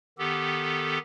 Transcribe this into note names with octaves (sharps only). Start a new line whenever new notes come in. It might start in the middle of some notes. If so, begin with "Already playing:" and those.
D#3 B3 G4 A4